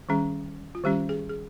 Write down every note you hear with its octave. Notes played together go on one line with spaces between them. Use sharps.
D#3 G3 C#4 G#4
F4
D#3 G3 C#4 G4
G#4
G#4